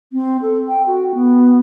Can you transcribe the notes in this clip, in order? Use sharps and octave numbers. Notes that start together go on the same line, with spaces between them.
C4
A4
G5
F#4
B3